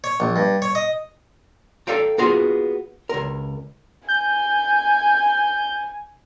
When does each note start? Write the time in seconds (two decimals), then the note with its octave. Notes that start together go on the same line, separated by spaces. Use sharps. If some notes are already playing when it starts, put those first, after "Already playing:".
0.04 C#5
0.20 A#1
0.36 G2
0.62 C#5
0.75 D#5
1.87 A4 D5 F5 G5 A#5
2.18 A#3 B3 F4 F#4 G#4 A#4
3.09 C#2 A#4
4.09 G#5 G6